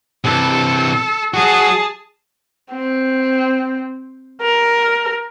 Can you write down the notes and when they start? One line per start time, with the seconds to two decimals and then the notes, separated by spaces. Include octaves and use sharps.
0.24 C3 E3 A4
1.34 F#3 F#4 G#4 A5
2.72 C4
4.41 A#4